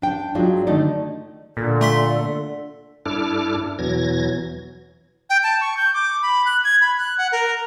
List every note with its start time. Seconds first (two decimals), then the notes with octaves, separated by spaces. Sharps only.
0.02 D4 G5
0.35 G2 F#3 G#3 D4 F4
0.67 D3 D#3 A3 D#4 D5
1.57 A#2 D3 A4
1.81 A3 C6 B6
3.06 G2 D4 E4 A4 D6 F6
3.79 E2 B2 E3 F#3 G#6 A#6
5.30 G5
5.43 A5
5.61 C#6
5.77 G6
5.94 D6
6.22 B5
6.46 F#6
6.64 G#6
6.81 B5
6.98 F#6
7.18 F#5
7.32 A#4